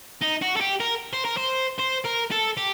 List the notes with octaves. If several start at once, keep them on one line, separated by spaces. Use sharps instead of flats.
D#4
F#4
A4
G4
A#4
C5
A#4
C5
C5
A#4
A4
G4